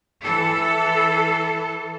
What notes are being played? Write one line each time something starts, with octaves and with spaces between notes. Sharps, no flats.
E3 A4